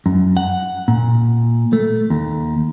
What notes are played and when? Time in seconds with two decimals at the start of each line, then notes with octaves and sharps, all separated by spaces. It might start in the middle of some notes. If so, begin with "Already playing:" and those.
0.06 F#2
0.37 F#5
0.88 A#2
1.73 A3
2.10 D#2